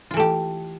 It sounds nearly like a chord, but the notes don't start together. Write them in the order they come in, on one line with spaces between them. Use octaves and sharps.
F4 E3 A3 G4